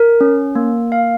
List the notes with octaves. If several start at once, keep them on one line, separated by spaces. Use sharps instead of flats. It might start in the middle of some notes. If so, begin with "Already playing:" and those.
Already playing: A#4
C#4
A#3
F5